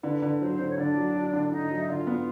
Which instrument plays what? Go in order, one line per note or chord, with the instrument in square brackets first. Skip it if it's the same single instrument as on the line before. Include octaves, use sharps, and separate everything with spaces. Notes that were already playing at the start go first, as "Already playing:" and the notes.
[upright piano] D3 [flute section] B4
[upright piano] D3
[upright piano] F#3 [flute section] C5
[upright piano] D3
[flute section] C#5
[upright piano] D3 [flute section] D4 D5
[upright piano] F#3
F#3
D3
[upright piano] D3 [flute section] D#4 D#5
[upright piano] F#3
[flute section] E5
[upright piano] D3 [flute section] F4 F5
[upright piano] B3